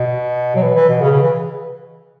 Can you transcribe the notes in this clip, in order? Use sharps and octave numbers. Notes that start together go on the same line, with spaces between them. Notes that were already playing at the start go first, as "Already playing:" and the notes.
Already playing: B2
F#3
E3
E3
B2
C#3
C#3
E3